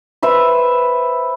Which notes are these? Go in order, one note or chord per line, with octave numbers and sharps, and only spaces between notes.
B4 C5 E5 B5